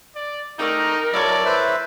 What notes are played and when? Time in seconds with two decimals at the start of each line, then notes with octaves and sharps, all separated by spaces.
0.15 D5
0.59 A3 D#4 A#4 D5 G5
1.14 F#3 E4 A4 C#5 D5
1.45 B4 C5 E5